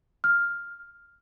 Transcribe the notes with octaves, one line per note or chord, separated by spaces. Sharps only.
F6